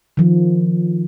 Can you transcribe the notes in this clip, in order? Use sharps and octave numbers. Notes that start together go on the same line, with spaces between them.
D#3 F3